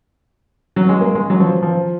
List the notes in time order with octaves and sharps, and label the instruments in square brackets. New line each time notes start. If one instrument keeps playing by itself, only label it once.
[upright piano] F#3
G#3
A#3
G#3
F#3
F3
F3